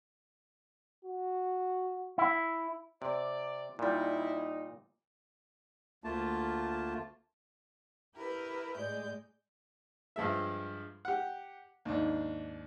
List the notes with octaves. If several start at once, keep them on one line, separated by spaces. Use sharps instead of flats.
F#4
E4
C3 D5
A#2 G3 D#4 E4
D2 A3 A#3 F4 A5
E4 G4 A#4 B4
A2 G#3 D5 G6
G2 F3 G#3 E5
G4 F#5
D#2 G#2 D4